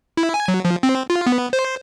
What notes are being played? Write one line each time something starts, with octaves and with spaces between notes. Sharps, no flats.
E4
G#5
F#3
F3
C4
F4
B3
C5